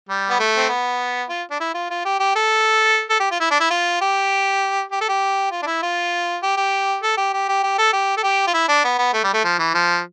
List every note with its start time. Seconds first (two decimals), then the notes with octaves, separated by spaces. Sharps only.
0.09 G3
0.30 B3
0.39 A3
0.57 C4
0.69 B3
1.29 F4
1.51 D4
1.60 E4
1.75 F4
1.90 F4
2.05 G4
2.20 G4
2.36 A4
3.10 A4
3.20 G4
3.31 F4
3.40 E4
3.51 D4
3.60 E4
3.71 F4
4.01 G4
4.92 G4
5.01 A4
5.09 G4
5.52 F4
5.62 D4
5.67 E4
5.82 F4
6.43 G4
6.57 G4
7.03 A4
7.17 G4
7.33 G4
7.49 G4
7.63 G4
7.78 A4
7.93 G4
8.17 A4
8.23 G4
8.47 F4
8.54 E4
8.69 D4
8.84 B3
8.99 B3
9.14 A3
9.24 G3
9.33 A3
9.44 F3
9.59 E3
9.74 F3